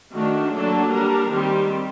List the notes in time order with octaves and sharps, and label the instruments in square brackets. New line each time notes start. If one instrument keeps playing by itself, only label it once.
[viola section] D#3 A3 D4 F#4
F#3 A#3 D4 A4
G3 D4 A#4
D#3 G3 C4 G4